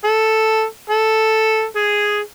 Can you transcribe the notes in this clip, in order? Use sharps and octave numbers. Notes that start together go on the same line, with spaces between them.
A4
A4
G#4